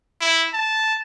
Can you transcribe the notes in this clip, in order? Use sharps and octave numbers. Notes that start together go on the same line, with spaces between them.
E4
A5